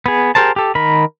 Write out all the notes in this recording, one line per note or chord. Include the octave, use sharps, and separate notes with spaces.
B3 G#4
G4 G#4 A#4 C5 A5
G4 A4
D#3 A#4 B5